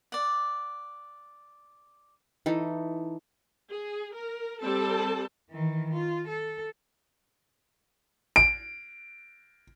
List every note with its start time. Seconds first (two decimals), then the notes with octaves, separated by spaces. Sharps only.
0.12 D5 F#5
2.46 E3 D#4 A4
3.69 G#4
4.15 A#4
4.62 G3 C4 A4 A5
5.50 D#3 E3
5.94 F4
6.28 A4
8.36 D7